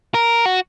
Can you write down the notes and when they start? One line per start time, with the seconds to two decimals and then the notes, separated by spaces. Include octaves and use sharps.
0.14 A#4
0.46 F#4